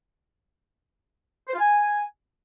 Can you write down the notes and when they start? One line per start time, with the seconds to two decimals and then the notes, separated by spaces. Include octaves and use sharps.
1.48 C5
1.54 F4
1.59 G#5